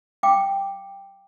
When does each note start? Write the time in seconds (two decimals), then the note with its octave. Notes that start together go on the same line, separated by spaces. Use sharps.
0.23 F5 G5 D6